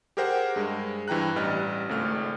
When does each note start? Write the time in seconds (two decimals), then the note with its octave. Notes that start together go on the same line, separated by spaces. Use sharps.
0.17 G4 G#4 A#4 C5 F#5 G5
0.56 G2 G#3
1.08 G2 E3 G5 A#5 F#6
1.36 A1 G3 D#5 F6 F#6
1.89 G#1 C#2 A3 F6